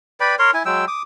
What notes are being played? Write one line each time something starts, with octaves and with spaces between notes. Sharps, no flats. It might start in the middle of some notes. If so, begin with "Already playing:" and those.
B4 D5 G5 B5
A#4 C#5 C6
E4 G#5
F#3 G#3 G5 E6
D6 D#6